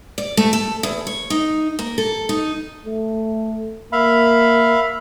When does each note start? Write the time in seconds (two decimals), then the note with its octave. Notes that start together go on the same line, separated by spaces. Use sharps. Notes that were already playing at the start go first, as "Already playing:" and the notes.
0.18 D5
0.37 A3
0.53 A4
0.83 E2
1.07 C#5
1.30 D#4
1.79 A#3
1.98 A4
2.29 D#4
2.85 A3
3.93 A#3 E5 F5 B5